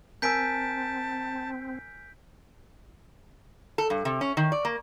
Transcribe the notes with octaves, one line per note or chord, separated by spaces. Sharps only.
C4 A#4 G#5 A5 E6 G6 B6 D7
A4
G2
C3
C#4
D#3
D5
A#3